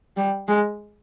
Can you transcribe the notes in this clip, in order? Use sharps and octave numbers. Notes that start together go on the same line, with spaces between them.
G3
G#3